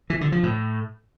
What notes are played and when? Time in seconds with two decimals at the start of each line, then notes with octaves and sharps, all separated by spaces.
0.10 E3
0.21 D3
0.32 F3
0.43 A2